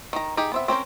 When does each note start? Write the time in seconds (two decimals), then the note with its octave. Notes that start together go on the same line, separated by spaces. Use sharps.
0.13 D#3 A#5
0.37 D#4 G4 G#4
0.52 B3 C4 E5
0.68 C4 C#4 A#4 C5